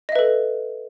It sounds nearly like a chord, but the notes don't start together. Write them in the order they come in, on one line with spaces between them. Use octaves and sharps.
D#5 E5 B4 A4